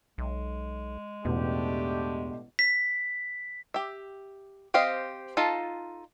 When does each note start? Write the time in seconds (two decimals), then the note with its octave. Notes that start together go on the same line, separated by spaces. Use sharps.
0.18 B1 G#3
1.25 A1 E2 B2 A3 D4 G4
2.59 B6
3.74 G4 E5
4.74 C4 G4 C5 D#5 F5
5.37 D#4 F4 A4 F5 A5